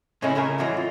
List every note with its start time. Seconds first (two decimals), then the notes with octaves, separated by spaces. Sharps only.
0.22 A2 C#3 G#3 A#3 C#4 E4
0.35 A2 C#3 E4 A#4 G#5
0.58 A2 E3 F#3 G#3
0.77 F4